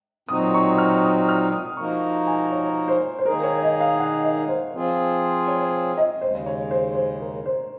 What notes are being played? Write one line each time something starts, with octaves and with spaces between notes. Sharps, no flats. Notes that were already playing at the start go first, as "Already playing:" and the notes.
A#2 F#3 C4 D#4 F#4 D#6
C#6
F6
D#6
F6
D#6
F3 A#3 D#4 F#4 A#4 C#6
G#5
C#5
C5
C5
D#3 A#3 D#4 G#4 A#4
C#5
D#5
F5
F#5
D#5
C5
F3 C4 F4 G#4
C#5
D#5
D#2 C#3 G#3 C5
C#5
C5
C5
A#4
C5